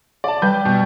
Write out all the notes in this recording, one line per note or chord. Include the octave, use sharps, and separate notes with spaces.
D5 A5
G3 B4 G6
B2